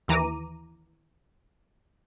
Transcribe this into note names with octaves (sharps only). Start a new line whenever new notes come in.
D#2 E3 A#5 D6 D#7